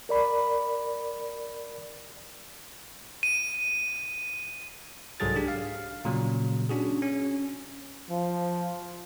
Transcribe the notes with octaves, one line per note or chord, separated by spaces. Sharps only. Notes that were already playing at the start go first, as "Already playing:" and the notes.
A#4 D5 B5
D#7
C2 G#2 F#3 G#4 A4 A6
D4 G4
F5
A#2 C#3 F#3
C#4 D4 F#4 G#4
C#4
F3